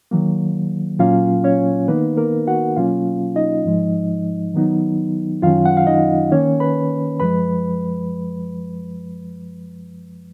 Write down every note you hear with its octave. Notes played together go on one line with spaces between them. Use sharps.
D#3 F#3 A#3
A#2 F#3 A#3 C#4 F4 F5
C#4 C#5
D#3 A#3 B3 D#4 B4
A#3 A#4
F#4 F#5
B2 F#3 A#3 C#4 F4 F5
D#4 D#5
G#2 F3 G#3
D#3 F#3 B3 D#4
F#2 D#3 F#3 C#4 F4 F5
F#5
F5
D#4 D#5
D#3 A#3 C#4 C#5
B4 B5
F#2 F3 G#3 B4 B5